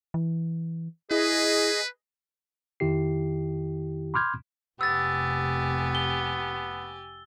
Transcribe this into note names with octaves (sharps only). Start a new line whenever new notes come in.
E3
E4 G#4 B4 D#5
F2 D#3 E4 G4 C7
B5 C6 D6 F6 G6 G#6
F1 C3 B3 G4 G#5 E6 A6
G7